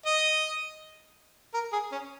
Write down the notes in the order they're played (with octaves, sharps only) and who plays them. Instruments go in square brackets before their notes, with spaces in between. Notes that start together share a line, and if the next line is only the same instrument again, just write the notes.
[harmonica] D#5
A#4
G#4
C#4